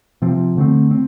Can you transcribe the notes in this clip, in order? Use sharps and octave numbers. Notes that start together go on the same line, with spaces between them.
C3 F3 C4
D3 A3 C4
C4